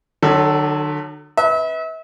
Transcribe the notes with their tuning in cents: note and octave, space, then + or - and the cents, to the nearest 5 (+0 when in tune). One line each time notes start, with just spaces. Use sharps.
D3 +45 F#3 +0 A4 +0
B4 +0 E5 -40